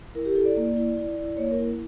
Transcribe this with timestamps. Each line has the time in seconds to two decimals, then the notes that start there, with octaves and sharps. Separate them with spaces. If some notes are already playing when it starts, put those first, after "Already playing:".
0.15 E4 A#4
0.25 G4
0.35 E4 A4
0.45 D5
0.57 A#3
0.77 E4
0.97 E4
1.17 E4
1.37 A#3 C#5
1.51 A#4
1.58 E4